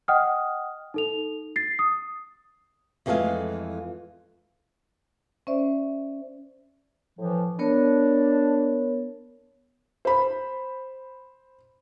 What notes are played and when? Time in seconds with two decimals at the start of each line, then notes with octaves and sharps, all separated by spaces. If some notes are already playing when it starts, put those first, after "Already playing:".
0.08 D#5 F#5 G5 D#6 F6
0.94 D#4 A4 F7
1.56 A6 C7
1.79 D#6
3.06 F2 E3 G#3 A3 G#4 F5
5.47 C#4 C5 D5 E5
7.18 A2 E3 F3
7.59 B3 D4 A#4 C#5
10.05 C5 B5